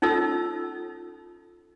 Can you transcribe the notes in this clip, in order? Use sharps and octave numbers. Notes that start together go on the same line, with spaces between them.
C#4 D#4 F4 A4 E6